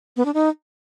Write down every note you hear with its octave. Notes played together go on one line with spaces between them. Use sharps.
B3
D4
D#4